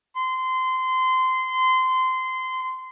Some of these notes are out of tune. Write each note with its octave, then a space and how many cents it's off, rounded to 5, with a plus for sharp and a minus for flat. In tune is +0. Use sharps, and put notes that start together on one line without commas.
C6 -20